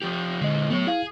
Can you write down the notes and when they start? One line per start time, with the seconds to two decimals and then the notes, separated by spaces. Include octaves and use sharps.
0.02 F3 G4
0.42 A#2 D3 G#3 D#5
0.70 F#3 A3 B3 C#5
0.87 E4 G#4 F5